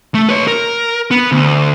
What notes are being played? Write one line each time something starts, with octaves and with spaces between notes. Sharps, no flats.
A3
B4 C#5
A#4
B3
D2